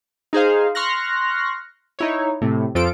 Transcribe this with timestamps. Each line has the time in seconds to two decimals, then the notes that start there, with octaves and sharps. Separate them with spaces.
0.33 D#4 G#4 C5 F5
0.75 C6 C#6 F6 F#6 A#6
1.99 D#4 E4 C#5
2.41 A2 C3
2.75 F2 F3 F4 A4 D7